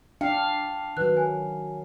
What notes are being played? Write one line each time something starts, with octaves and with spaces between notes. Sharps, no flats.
D4 F5 G5
D#3 F#3 B4 F#6
G#5